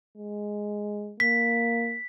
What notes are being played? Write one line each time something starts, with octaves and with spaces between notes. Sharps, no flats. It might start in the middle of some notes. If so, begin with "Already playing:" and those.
G#3
A#3 B6